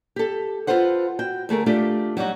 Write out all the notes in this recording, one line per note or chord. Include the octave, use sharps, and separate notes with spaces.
G4 A4
F4 G#4 A4 B4 C5 F#5
F#4 G5
D2 A3 G#4 A#4
A3 D4 F4 G4
F#3 G3 D#4 F#4